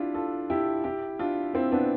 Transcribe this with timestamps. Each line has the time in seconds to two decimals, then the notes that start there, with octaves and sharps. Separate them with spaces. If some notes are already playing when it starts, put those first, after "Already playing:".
Already playing: D4 E4 F4 G4
0.14 F4 A4
0.50 E4 G4
0.84 E4 G4
1.19 D4 F4
1.54 C4 E4
1.72 B3 D4